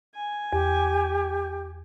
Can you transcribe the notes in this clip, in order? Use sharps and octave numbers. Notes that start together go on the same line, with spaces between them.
G#5
E2 G4